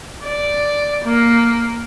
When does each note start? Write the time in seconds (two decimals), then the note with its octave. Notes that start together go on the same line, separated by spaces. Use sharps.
0.24 D5
1.04 A#3